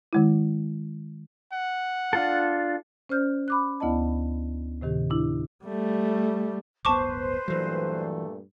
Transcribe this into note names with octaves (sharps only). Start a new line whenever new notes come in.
D#3 G#3 E4
F#5
D4 F4 A4
C#4 C5 D5 F6 G6
B5 D6 F#6
D2 B3 E4 D5 D#5 A5
A2 C3 D#3 G4
D4 E4
G3 A3
D1 G1 B3 B4 C5 A5 C#6 D6
G2 A#2 E3 F#3 A3